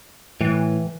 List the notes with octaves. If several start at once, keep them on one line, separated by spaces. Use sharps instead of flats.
A2 E3